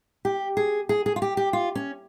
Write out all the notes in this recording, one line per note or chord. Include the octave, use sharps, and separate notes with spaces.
G4
G#4
G#4
G#4
F4
G4
G4
F4
C#4